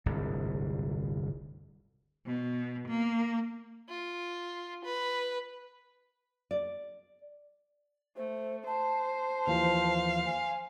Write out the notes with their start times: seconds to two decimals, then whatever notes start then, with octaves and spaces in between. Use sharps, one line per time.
0.06 D1 G1 C2 G#2
2.26 B2
2.88 A#3
3.89 F4
4.84 B4
6.51 D5
8.17 A3 C5
8.67 C5 A5
9.47 D#2 E3 F3 F5
10.26 G#5